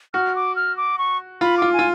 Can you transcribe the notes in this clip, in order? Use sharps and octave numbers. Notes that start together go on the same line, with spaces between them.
F#4 F6
D6
F6
D6
C#6
F4 B5
F4 D6
G#5
F4